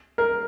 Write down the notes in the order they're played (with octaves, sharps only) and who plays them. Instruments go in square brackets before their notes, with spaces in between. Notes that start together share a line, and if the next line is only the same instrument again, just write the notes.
[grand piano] A#4